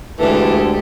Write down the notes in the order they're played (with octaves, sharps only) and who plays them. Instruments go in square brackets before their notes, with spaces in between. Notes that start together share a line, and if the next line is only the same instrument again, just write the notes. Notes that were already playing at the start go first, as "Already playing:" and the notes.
[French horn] D2 [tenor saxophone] E3 [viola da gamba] G#3 G4 A4